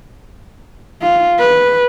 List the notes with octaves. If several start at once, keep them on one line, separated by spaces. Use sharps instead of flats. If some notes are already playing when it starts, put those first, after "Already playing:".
F4
B4